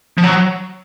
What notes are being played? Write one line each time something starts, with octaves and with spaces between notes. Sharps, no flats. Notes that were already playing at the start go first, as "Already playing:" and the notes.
F3
F#3